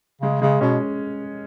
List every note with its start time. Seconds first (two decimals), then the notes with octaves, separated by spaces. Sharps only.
0.22 C#3 G#3
0.41 C#3 G#3
0.61 B2 C#4